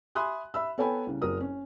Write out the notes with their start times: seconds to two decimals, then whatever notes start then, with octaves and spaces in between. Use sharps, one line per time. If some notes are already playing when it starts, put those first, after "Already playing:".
0.15 E5 G#5 B5 C6 D#6 F#6
0.54 E5 B5 E6
0.78 B3 A4 C#5 G5 G#5 B5
1.07 C2 C#3
1.22 F#1 F#3 A#4 D#6
1.40 C#4